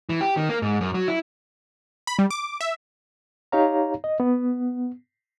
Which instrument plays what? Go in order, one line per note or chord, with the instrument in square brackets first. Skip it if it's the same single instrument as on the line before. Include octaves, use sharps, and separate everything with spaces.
[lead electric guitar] E3
G4
D#3
A#3
G#2
F#2
F#3
E4
[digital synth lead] B5
G3
D6
E5
[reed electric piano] D#4 G4 C#5 F5 A#5
D#5
B3